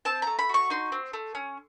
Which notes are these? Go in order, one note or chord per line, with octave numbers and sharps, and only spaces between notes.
C4 A5
A3 A#5
B5
F#4 C#6
D#4 C6
C4
A3
C#4